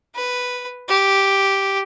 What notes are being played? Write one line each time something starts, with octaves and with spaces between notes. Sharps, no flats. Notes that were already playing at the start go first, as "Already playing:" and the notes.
B4
G4